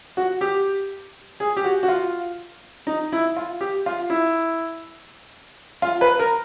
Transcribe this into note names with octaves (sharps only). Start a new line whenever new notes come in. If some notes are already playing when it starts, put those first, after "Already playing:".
F#4
G4
G#4
G4
F#4
F#4
F4
D#4
E4
F4
G4
F4
E4
F4
B4
A#4